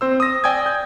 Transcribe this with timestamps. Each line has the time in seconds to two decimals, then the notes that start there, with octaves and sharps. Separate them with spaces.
0.01 C4 C5 E6
0.20 D#6 A#6
0.44 D5 G5 G#5 D#6 G#6
0.66 G6